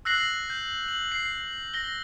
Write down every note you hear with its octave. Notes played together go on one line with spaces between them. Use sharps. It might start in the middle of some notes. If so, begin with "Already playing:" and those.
E6 F#6 A#6 C7 F#7
G6
F#7
C7
A#6 G7